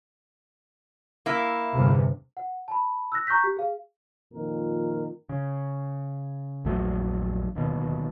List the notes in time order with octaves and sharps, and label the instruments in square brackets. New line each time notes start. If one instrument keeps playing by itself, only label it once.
[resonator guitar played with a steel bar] A#3 E4
[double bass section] G1 E2 C3
[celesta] F#5
A5 B5
E6 F#6 A#6
A#5 C#6 F#6 G6 B6
G4
G#4 F5
[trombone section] F2 A#2 D#3 A#4
[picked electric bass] C#3
A#1 E2 F#3 A3
D1 D#2 B2